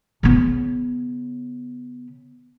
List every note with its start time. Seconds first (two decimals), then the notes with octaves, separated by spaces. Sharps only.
0.23 C#3 B3